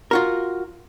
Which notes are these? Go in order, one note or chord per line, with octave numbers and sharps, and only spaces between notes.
F4 F#4 A#4